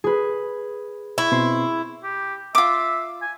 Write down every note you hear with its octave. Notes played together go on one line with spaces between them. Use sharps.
G#4 B4
E4 C#6
B2 C4 C6
G4
F4 E5 D6
G#5